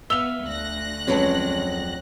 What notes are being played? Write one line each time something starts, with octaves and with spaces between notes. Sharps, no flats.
B3 E5 F5 F7 G7
D2 F#6 A#6
F2 F#3 G#3 C#4 B4 A5